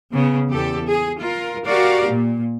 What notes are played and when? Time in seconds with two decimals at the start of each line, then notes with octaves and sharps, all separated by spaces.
0.13 C#3 B3
0.51 E2 G4 A4
0.89 G#4
1.22 F4 A#4
1.65 F#4 G4 A#4 D5 F5
2.09 A#2